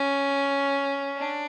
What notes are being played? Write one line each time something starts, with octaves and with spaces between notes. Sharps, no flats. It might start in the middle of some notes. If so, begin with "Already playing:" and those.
Already playing: C#4
D4